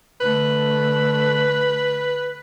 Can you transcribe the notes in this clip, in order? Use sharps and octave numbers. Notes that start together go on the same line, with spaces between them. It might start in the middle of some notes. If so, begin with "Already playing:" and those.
D3 A3 B4